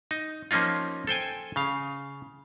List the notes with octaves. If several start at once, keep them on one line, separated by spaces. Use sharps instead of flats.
D#4
F3 A#3 C#4 D#4 F4
A4 C5 G5 G#5
C#3 F5